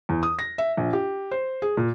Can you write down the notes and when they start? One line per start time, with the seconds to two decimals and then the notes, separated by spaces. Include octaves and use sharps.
0.09 E2
0.23 D#6
0.39 A#6
0.58 E5
0.77 A#1
0.93 G4
1.31 C5
1.62 G#4
1.77 A#2